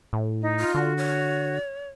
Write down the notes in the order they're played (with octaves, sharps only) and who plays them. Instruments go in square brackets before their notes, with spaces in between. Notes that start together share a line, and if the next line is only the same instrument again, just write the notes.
[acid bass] A2
[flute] D#4
[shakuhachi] F4
[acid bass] D3 [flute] F#4
[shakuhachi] C#5